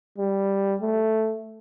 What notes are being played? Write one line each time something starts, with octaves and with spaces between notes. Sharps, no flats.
G3
A3